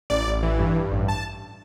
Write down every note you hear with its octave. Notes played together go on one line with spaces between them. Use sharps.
A1 D5
A1
E3
G2
G2
A1
A5